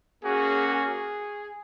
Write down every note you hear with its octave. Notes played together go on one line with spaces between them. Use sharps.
A#3 C#4 F#4 G#4
G#4